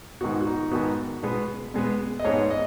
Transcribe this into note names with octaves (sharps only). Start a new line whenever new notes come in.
G#2 D#3 B3 F#4
F#4
D#4
G#2 D#3 B3 F#4
B2 G#3 B3
B2 G#3 B3
D#5
G#2 G#3 B3 C#5
D#5